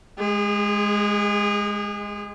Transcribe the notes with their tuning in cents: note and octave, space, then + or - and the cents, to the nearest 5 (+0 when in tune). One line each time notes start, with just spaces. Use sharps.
G#3 +5 G#4 -35